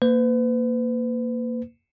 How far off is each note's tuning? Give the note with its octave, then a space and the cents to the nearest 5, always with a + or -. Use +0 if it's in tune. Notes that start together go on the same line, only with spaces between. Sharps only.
A#3 -5 B4 +40